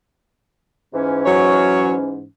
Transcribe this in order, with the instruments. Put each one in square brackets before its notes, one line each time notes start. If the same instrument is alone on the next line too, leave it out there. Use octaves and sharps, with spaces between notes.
[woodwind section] G#2 E3 C#4
[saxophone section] F#3 C#5